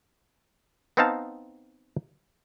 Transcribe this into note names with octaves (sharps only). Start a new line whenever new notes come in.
B3 C4 D#4 F5 A5